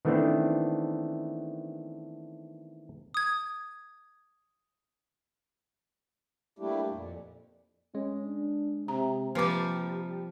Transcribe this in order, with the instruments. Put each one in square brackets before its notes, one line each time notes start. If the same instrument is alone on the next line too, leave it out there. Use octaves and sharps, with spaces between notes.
[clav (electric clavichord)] D#3 E3 A3 B3 C4 D4
[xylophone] D#6 G#6
[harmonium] G3 A3 A#3 D4 E4 G4
F2 A#2
[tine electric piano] G#3 [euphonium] C#4
[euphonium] D4
[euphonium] C3 [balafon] A#5
[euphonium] C3 [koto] F3 G3 [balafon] A#3 B4 D6 [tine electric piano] A#5 F6